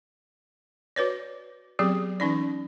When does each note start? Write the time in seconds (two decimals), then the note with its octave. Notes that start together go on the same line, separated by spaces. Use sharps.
0.96 F#4 B4 C#5 D5
1.79 F#3 B3 C4 G4 G#4
2.20 E3 C#4 D#4 D5